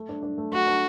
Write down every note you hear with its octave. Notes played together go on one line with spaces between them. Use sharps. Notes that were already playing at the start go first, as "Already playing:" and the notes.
Already playing: A3
D4
D4
A3
A3 F#4
D4